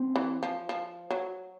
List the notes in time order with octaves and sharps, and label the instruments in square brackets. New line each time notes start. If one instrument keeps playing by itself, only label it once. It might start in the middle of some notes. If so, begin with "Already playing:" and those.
Already playing: [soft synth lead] C4
[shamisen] E3
F3
F3
F#3